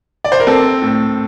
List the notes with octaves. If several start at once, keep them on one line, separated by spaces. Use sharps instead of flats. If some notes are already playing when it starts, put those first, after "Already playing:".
D5
C5
A#4
C4 A4
A2